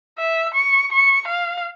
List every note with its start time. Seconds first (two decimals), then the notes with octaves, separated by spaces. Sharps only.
0.18 E5
0.54 C#6
0.92 C#6
1.28 F5